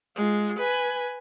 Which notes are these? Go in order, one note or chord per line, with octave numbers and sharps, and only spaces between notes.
G#3 F4
B4 G#5